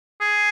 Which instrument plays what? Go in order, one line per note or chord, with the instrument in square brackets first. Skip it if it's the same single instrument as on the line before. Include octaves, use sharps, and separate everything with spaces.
[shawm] G#4